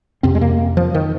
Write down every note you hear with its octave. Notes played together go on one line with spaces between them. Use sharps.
F2 C3 C4
G#3
A#3
F3
D#3